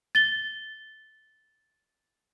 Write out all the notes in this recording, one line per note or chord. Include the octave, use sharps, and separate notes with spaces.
A6 G7